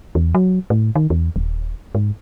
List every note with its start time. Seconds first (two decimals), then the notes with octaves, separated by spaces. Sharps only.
0.15 E2
0.35 F#3
0.70 A2
0.96 D#3
1.10 E2
1.36 D#1
1.95 G#2